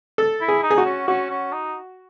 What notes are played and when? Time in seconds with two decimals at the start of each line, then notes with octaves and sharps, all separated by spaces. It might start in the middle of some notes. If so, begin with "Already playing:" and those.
0.18 A4
0.41 E4
0.48 G#4
0.63 D#4
0.70 G#4
0.75 D#4 F#4
0.85 C#4
1.08 C#4 F#4
1.30 C#4
1.52 D#4